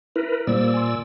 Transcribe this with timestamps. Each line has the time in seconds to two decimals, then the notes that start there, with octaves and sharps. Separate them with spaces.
0.16 E4 A#4 B4
0.47 A#2 G3 A#3 C5 D5 E6
0.74 G#5 C6